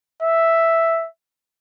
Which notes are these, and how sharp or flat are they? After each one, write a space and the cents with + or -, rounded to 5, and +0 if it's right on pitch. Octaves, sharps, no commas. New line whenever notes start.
E5 +0